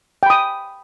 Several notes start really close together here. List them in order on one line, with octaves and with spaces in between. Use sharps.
G5 B5 D#6